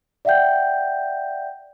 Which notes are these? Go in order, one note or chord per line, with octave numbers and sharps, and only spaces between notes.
D5 E5 F#5 G5 G6